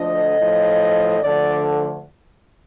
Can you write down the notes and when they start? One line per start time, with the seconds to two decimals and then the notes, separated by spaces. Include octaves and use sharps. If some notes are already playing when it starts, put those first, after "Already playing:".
Already playing: D2 D3 F3 D#5
0.38 A2 F3
1.19 D2 D3 F3 D5